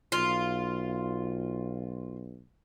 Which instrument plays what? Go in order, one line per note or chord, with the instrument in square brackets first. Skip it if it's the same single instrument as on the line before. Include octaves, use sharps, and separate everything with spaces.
[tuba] B1 [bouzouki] F4